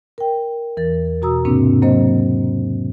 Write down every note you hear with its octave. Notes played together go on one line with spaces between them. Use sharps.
A#4 G5
E2 E3 A#4 A6
B2 F#4 A#5 D#6 E6
G#2 C3 A#3 C4 D4
F#3 A#3 C4 C5 D#5